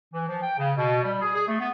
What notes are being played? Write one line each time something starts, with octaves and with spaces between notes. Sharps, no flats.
E3
F3
G5
C#3
B2
G3
G#4
G#4
A3
B3